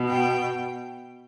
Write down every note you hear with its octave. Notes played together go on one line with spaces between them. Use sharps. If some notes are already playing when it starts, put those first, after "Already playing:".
Already playing: B2
G5